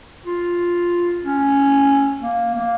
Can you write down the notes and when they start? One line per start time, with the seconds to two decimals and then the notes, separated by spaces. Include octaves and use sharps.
0.26 F4
1.24 C#4
2.21 A#3
2.55 A#3